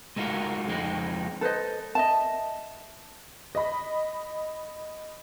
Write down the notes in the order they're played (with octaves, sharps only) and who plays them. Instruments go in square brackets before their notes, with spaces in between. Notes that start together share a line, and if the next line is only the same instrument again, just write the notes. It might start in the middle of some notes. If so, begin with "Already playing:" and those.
[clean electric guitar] G#3 A3 D#4 F4 F#4 A#4
F2 F3 G#3 C4 D#4
[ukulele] A4 B4 C5 D#5
D#5 E5 A5
[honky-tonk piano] D#5 B5